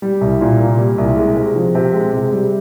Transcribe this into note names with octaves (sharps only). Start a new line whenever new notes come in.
G3
C2
A#2
A#3
G3
C2
G#3
C3
F3
C3
G#3
C3
G3